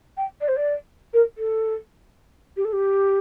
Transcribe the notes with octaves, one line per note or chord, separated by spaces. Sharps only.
G5
D5
C5
D5
A#4
A4
G4
A4
G4